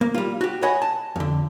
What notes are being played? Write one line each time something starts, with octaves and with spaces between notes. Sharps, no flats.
A#3
G3 F4
F#4 G4
C#5 D#5 F#5 G#5 B5
A5
F2 D3